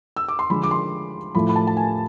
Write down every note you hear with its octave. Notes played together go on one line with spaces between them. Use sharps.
E6
D6
C6
D3 F3 G#3 B5
D6
C6
A2 F3 A3 B5
B5
A5
A5
G#5